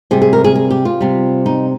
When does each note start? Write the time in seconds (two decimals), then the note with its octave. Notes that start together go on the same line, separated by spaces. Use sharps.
0.11 C3 G3 G#4
0.22 G#4
0.33 A#4
0.44 G#4
0.55 G#4
0.70 G4
0.85 F4
1.01 C3 G3
1.46 D#4